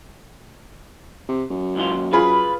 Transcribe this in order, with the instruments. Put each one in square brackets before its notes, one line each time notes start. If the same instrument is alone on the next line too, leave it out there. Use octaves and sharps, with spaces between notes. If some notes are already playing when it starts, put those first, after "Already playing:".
[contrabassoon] C3
F#2
[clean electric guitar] C#2 E3 F4
D#2
[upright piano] F4 G#4 B5 [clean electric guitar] B4